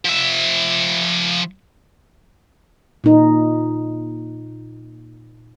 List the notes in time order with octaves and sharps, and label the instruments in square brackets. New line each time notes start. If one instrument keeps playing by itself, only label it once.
[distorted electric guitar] F3 E5
[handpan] A#2 D#4